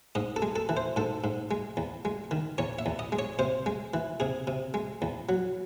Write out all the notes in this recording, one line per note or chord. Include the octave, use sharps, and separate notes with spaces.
G#2 D#5
A4
G#3
A4
E3
C5
G#2 A4
G#2
G#3
E2
G#3
D#3
E2 C#5
E5
E2
D#5
G#3
C#5
C3 C5
G#3
E3
C3 G#4
C3
G#3
E2
F#3